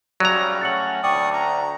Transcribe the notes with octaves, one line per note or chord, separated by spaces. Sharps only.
G#1 C#3 F#3 G3 D5 A#5
A3 C#4 F#4 A6 C#7 F#7
D2 D5 G5 C#6 D#6
A#5